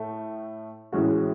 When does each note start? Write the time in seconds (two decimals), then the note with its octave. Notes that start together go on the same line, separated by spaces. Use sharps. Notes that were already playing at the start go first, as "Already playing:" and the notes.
Already playing: A2 A3
0.92 A2 E3 G#3 C#4 F#4